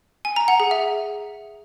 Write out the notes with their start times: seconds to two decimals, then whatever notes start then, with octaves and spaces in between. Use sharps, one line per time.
0.25 G#5
0.36 A#5
0.48 F#5
0.60 G#4
0.71 E5